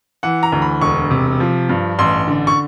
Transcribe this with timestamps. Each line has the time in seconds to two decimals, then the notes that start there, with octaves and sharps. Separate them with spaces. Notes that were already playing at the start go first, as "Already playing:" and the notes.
0.23 E3 F#5
0.43 A#5
0.52 D2
0.62 B5
0.81 E1 C#6
1.11 C3
1.40 F3
1.69 G2
1.99 A1 C6
2.28 D3
2.47 C#6